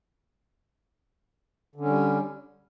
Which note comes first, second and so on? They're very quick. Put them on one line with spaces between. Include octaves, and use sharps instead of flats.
D3 C#4 G3